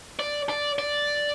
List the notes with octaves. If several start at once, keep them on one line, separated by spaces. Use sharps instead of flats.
D5
D5
D5